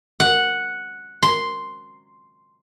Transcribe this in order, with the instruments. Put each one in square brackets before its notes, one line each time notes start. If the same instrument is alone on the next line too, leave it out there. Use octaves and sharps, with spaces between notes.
[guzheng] F#5
C6